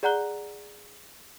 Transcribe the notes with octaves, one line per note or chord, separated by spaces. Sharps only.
G#4 D5 F#5 A#5 F#6 G7